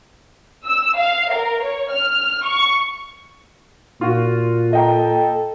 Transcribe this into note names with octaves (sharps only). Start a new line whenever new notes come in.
E6
F5
A#4
C#5
F6
C#6
A#2 F4 F#4
A4 D#5 G5 A#5